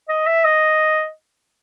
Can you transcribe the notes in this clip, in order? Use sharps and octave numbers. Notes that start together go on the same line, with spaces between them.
D#5
E5
D#5